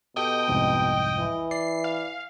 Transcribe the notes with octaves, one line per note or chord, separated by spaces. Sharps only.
B2 G4 A4 D#5 G5
C2 F2 G#2
E3
D5 C7
F5